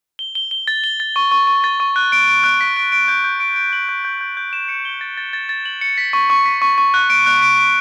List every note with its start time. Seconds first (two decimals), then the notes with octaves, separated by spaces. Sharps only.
0.19 G7
0.35 G7
0.51 G7
0.68 A6
0.84 G7
1.00 A6
1.16 C#6
1.32 C#6
1.47 C#6
1.64 A6
1.80 C#6
1.96 F#6
2.12 D7
2.28 D7
2.44 F#6
2.61 B6
2.76 D7
2.92 D7
3.08 G6
3.24 G6
3.40 D7
3.56 D7
3.73 F#7
3.89 G6
4.05 G6
4.21 G6
4.37 G6
4.53 E7
4.69 C#7
4.85 G7
5.01 A6
5.17 A6
5.33 A6
5.49 A6
5.65 F#7
5.81 C#7
5.98 B6
6.13 C#6
6.30 C#6
6.46 B6
6.62 C#6
6.78 C#6
6.94 F#6
7.10 D7
7.26 F#6
7.42 D7
7.58 D7